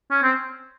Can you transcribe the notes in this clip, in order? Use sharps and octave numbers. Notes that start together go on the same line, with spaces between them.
C#4
C4